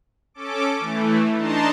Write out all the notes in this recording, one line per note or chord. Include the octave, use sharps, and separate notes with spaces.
C#4 A4 D6
E3 A3
D4 D#4 A5 A#5 C6